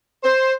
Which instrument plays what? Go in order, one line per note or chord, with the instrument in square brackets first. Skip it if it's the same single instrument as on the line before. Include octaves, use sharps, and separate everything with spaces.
[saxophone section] C5